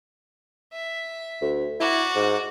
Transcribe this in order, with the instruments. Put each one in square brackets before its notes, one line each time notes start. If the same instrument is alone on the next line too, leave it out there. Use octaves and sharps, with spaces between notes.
[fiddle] E5
[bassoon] D2
[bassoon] E4 [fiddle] F#4 D5
[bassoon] G#2